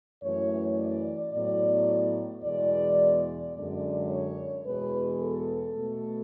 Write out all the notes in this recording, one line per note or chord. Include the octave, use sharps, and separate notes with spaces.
F#2 E3 A3 C#5
D5
A2 F#3 B3 D5
E2 B2 G#3 D5
F#2 D3 G#3 D5
C#5
E2 B2 G#3 B4
A4
B2 A3